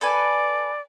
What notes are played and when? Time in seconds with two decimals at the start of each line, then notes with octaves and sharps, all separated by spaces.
0.01 A4 B4 D5 G#5